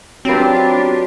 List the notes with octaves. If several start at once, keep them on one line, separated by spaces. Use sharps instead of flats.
F#3 C4 D4 F4 G4 B4